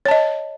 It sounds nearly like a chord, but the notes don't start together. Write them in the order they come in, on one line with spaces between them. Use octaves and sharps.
C#5 A5 D#5